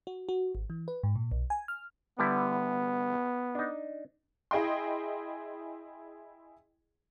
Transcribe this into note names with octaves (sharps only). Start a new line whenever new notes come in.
F#4
F#4
G#1
E3
B4
G#2
A#2
B1
G#5
F6
D3 G3 B3 E4
D4 D#4
E4 G#4 D#5 G5 C6